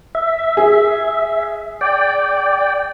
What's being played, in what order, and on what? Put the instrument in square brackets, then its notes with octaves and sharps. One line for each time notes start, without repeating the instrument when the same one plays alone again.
[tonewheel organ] E5
[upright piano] G#4
[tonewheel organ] D5 G5